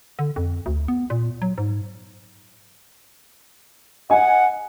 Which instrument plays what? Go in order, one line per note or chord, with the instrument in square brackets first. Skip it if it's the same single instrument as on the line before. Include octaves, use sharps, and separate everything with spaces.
[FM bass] D3
F2
D2
B3
A#2
F#3
G#2
[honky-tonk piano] D#5 G#5 [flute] F#5